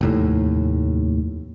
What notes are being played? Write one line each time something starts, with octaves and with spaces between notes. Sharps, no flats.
F1 D#2 A2